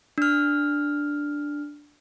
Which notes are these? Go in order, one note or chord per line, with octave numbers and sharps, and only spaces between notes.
D4 F6